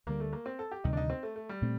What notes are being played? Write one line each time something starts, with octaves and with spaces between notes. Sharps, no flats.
D2 D3 G3 A#3
A3
A#3
C4
A4
G4
D2 C3 D#3 G3 D#4
D4
D#4
C4
A3
A3
G3
A#2 A3 C4